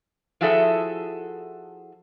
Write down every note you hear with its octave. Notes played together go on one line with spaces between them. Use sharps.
F3 E4 F#4 G#4 A4 E5